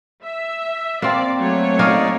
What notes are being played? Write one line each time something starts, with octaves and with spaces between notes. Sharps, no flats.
E5
A#3 C4 D5
F#3 A3 C#5
A#3 C#4 D#4 A#4 D5 D#5